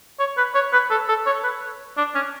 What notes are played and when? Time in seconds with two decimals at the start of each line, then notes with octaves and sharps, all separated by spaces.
0.19 C#5
0.37 B4
0.54 C#5
0.73 B4
0.91 A4
1.08 A4
1.26 C#5
1.44 B4
1.97 D4
2.15 C#4